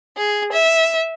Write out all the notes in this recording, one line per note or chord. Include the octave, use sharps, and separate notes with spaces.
G#4
E5